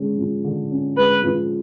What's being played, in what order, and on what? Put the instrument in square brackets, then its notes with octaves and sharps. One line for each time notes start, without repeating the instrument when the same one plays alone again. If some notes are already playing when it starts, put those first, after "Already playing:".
Already playing: [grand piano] D3 G#3 C#4
F3
D3
C#4
[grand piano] G#3 [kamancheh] B4
[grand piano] F3